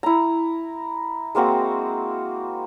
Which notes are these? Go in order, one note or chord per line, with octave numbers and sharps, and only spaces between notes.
E4 A#5
G#3 A#3 C4 F#4